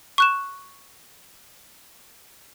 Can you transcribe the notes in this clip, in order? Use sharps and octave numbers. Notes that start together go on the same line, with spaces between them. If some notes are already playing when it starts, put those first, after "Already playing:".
C#6 F#6 E7